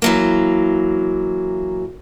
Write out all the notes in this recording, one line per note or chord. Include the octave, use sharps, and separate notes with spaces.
E3 F#3 A#3